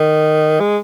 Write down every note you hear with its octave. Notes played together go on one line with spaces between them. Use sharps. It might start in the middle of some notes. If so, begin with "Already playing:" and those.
Already playing: D#3
G#3